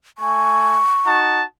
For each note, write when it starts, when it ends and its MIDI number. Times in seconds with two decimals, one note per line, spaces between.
0.18 0.80 57
0.18 0.80 80
0.18 1.17 85
1.06 1.44 63
1.06 1.44 66
1.06 1.44 81